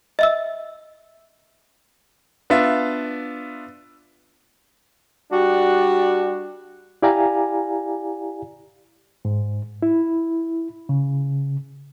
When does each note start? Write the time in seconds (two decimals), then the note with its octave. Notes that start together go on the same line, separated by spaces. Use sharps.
0.19 D#5 E5 E6
2.50 B3 D4 F4 E5
5.32 G3 D4 F#4
7.02 E4 G4 D5 F5 G#5 A#5
9.25 G#2
9.82 E4
10.89 C#3